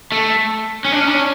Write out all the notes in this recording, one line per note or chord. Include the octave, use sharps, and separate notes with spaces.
A3
C#4
D4
C#4
D4
C#4